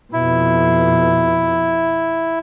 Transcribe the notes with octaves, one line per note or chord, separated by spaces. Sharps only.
F2 B2 E4